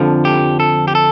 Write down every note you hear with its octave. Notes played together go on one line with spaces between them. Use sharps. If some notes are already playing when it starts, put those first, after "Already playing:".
Already playing: F2 D3 F3
G4
A4
G4
A4